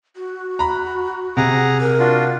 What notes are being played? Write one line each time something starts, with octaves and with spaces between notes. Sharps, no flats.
F#4
A#5 B5
C3 G#4 F#5 A#5
A#4
D4 F4 F#4